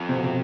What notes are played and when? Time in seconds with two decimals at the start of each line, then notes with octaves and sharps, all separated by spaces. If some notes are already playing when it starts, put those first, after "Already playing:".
Already playing: F2
0.09 C3
0.17 B2
0.24 C3